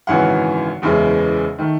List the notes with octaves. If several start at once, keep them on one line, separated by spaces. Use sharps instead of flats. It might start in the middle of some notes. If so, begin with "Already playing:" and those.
G#1 F#2 C#3 E3 F#5
F#1 E2 C#3 E3 G#3
D#3 A3